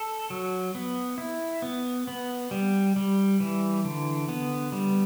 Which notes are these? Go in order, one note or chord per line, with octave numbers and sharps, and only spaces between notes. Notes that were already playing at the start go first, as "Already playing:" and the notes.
Already playing: A4
F#3
B3
E4
B3
B3
G3
G3
E3
D3
B3
G3